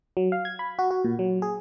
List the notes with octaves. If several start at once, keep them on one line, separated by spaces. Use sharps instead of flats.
F#3
F5
G#6
B5
F#4
F#4
A#2
F#3
G#4